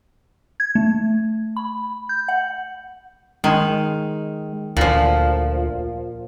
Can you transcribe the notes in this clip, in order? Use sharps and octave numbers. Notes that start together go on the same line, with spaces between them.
G#6
A3
B5
G6
F#5
D#3 G#3
D2 A#2 F3